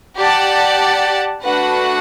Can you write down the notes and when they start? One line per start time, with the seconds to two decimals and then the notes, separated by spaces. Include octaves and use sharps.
0.17 G4 D5 F#5 A5
1.44 A3 D4 F#4 B4 F#5